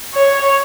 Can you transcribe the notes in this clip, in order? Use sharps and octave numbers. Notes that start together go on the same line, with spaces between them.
C#5